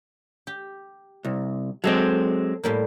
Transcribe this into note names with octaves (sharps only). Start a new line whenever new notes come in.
G4
C2
F#3 G#3 C4 A4
A2 G3 A#3